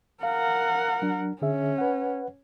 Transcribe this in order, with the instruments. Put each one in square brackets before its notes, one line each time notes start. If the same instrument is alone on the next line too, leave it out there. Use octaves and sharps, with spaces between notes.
[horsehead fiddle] A#4 F#5 [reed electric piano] F5
[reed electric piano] F#3 D4
[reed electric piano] D3 G#4 E5 [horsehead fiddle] C#4
[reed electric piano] B4 F#5